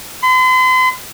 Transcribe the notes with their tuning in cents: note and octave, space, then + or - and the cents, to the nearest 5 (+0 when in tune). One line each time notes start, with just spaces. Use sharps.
C6 -45